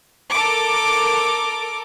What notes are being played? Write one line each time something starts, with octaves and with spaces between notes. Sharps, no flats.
A4 A#4 D6